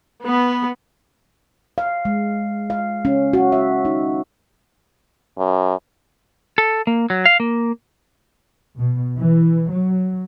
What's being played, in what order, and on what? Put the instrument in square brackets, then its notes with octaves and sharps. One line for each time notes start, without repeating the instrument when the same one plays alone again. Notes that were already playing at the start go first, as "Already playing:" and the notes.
[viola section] B3
[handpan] F5
G#3
F5
C#4
F#4
E5
D#4
[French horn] F#2
[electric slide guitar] A4
A#3
F#3
F5
A#3
[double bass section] B2
E3
F#3